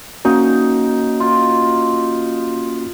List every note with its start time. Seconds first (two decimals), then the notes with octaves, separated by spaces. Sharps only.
0.25 A#3 C#4 D#4 F#4
1.20 F4